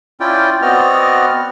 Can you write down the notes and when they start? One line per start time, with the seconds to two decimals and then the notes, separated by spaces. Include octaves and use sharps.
0.20 C#4 E4 F4 D5 G5
0.62 B3 C4 F#4 D5 D#5 F6